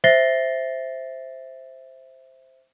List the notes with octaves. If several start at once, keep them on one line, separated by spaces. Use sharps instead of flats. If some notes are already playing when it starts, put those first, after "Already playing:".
C5 E5 A6 A#6 C7 G7